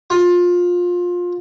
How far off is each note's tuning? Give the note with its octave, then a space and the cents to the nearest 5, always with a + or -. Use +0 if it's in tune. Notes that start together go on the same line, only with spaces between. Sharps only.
F4 +20